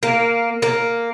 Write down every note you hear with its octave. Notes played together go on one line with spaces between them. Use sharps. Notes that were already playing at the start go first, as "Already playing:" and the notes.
A#3
A#3